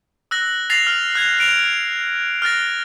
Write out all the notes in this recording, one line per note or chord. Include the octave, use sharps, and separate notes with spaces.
E6 F#6 A#6
E6 A6 A#6 C7 F7
F6
F#6 G#6 F7
F#6 D7 F7
F6 F#6 A6 A#6